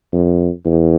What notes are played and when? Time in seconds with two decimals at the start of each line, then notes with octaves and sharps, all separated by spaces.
0.13 F2
0.66 E2